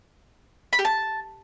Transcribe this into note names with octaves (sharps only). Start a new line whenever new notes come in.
B5
G4
A5